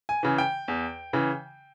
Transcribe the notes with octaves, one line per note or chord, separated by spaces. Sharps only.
G#5
C#3 E3
G5
E2
C#3 E3